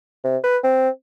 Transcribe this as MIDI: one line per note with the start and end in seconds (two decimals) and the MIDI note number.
0.24 0.37 48
0.44 0.58 71
0.64 0.89 60